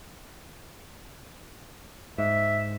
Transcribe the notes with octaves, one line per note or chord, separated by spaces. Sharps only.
G#2 E5